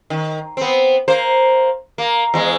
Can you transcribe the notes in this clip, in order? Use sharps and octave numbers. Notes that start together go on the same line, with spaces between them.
D#3
B3 C4
A#3 C5
A#3
E2 G#3